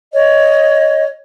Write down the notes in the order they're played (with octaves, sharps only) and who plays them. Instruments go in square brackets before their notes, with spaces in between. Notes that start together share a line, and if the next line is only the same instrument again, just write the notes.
[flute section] C#5 D#5